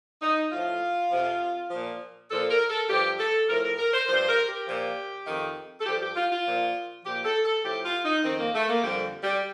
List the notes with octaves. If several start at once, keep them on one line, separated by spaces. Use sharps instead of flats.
D#4
A2 F3 F4
F2 C3 F3
A#2 F3
A#2 F3 A4
A#4
A4
G2 F3 G4
A4
A2 F3 A#4
A#4
A#4
C5
G2 F3 C5
A#4
G4
A#2 F3
F2 D#3
A4
G2 F3 G4
G4
F4
F4
A#2 F3
A#2 F3 G4
A4
A4
A2 F3 G4
F4
D#4
F2 D#3 C4
A#3
A3
A#3
F2 D3 F3 G3
G3